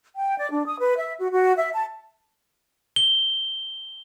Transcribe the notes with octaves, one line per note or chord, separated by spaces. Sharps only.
G5
D5
D4
D#6
B4
E5
F#4
F#4
E5
A5
G7